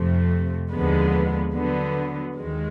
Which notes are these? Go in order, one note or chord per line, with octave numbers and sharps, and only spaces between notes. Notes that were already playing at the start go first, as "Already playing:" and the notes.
Already playing: F2 C3 F3 A3
D#2 D3 F3 G#3 B3
D3 F#3 B3
D#2 D#3 G#3